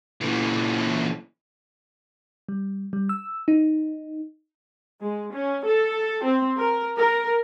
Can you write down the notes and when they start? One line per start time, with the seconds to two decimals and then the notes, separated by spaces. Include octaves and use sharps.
0.21 A#2 E3
2.49 G3
2.93 G3
3.09 E6
3.48 D#4
5.00 G#3
5.33 C#4
5.66 A4
6.24 C4
6.58 A#4
6.97 A#4